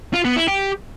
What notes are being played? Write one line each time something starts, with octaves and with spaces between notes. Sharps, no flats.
F4
B3
E4
G4